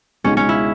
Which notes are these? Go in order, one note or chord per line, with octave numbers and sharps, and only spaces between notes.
C#2 B2 G#3 C#4 D#4
C#4
E4